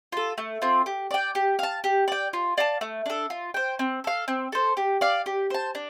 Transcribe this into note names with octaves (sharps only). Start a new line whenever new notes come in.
F4 A4
A3
C4 F4
G4
D5 G5
G4
F5 A5
G4
D5 G5
F4
D5 F5 A5
A3
D4 A4
F4
C5 G5
C4
A4 F5
C4
A4 C5
G4
D5 F5
G4
C5 A5
D4